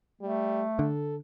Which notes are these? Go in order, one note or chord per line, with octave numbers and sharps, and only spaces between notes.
G3 A3
D3 A4